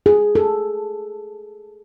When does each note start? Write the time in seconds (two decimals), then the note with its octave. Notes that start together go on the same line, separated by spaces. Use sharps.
0.06 G#4
0.35 A4